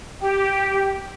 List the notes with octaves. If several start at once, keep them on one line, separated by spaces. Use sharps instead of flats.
G4